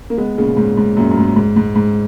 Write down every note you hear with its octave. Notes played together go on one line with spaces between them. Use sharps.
A#3
G#3 B3
A#2 C#3
G#2
G#2
F#2 A#2
F#2
G#2
G#2
G#2
G#2